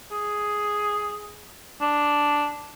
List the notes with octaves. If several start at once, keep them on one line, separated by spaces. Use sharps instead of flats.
G#4
D4